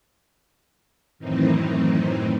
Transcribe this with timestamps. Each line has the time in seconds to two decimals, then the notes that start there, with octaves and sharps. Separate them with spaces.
1.18 F#2 A2 D#3 E3 C4 D#4